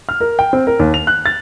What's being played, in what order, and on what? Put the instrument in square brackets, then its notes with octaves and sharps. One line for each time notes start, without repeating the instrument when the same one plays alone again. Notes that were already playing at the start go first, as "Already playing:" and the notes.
[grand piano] F6
A#4
G5
C4
A#4
D#2
F7
F#6
A6